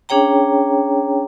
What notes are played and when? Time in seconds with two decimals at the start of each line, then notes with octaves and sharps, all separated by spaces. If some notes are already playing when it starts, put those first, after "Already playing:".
0.09 C#4 D4 G#4 C#5 G5 A#5